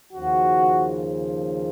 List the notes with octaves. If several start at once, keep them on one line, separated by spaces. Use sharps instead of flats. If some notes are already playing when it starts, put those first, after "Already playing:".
D#2 C#3 F3 F#4